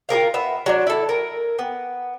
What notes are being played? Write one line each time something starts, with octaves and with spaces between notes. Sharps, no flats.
F4 G#4 A#4 F5
B3 E5
F#3 D4
E4 A4
A#4
B3